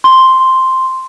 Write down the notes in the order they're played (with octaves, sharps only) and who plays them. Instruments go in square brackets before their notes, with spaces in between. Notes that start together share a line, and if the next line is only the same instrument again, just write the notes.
[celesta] C6